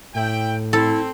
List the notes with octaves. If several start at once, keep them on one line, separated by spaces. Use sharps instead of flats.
A2 E4 G5
C4 E4 A4